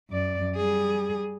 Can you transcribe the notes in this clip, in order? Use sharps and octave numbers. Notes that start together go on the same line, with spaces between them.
F#2 D5
G3 G#4